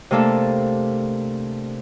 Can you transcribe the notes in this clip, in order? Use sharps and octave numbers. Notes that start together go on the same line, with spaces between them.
C3 A3 A#3 D4 A4